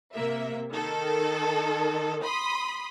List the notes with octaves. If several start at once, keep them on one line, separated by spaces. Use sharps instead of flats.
C3 A#3 E5
D#3 A4
B5 C6 D#6